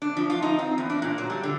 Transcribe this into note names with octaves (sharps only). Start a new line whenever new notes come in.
D4
F3
F4
D#4
C4
E2
D4
A#2
F#3
G3
D3